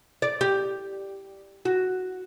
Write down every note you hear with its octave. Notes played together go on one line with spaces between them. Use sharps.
D5
G4
F#4